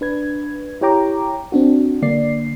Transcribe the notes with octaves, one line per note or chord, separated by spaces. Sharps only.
D4 B4 G#6
E4 G4 C#5 G5 A#5 D6
C4 D4 F#4
D3 A#3 D5 C7